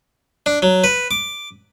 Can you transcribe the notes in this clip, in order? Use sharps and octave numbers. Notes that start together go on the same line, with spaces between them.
D4
F#3
B4
D6